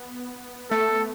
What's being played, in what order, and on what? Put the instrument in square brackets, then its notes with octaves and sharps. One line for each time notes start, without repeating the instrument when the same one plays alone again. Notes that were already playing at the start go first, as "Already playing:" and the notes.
Already playing: [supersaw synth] B3
[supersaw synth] A3 [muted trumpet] A4